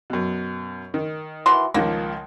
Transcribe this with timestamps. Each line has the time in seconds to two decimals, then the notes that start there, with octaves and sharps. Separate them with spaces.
0.10 F#2 B2
0.94 D#3
1.46 E3 F#4 C6
1.74 C#2 D#3 F3 A#3